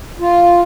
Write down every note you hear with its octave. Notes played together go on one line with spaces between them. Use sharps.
F4